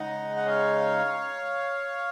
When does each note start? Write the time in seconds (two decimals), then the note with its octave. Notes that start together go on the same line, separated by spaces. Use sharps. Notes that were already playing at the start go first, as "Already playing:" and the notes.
Already playing: C#3 G#3 D#4 D#5 F#5
0.37 F#5
0.46 C#5 F5